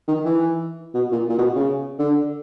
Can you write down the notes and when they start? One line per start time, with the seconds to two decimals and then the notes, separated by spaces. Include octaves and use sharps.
0.08 D#3
0.25 E3
0.95 B2
1.12 A#2
1.30 A#2
1.38 B2
1.56 C#3
1.99 D3